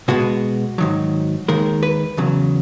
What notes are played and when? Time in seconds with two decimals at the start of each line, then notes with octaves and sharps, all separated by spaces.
0.08 B2 G#3 B3 F#4
0.78 G#2 D#3 F#3
1.48 D#2 D#3 G#3 A#4
1.83 B4
2.17 E2 C#3 F#3